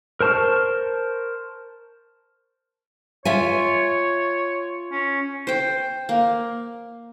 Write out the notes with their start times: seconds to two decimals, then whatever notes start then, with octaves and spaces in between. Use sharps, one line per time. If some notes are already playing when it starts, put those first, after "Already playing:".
0.21 A#4 C5 A5 C#6 F6
3.25 F4 C#5 E5 G#5
4.92 C#4
5.47 C5 G5
6.09 A#3